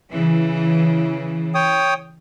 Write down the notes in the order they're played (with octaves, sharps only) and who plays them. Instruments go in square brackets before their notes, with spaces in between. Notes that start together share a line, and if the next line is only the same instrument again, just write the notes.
[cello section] C#3 E3
[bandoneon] C#5 G5 D#6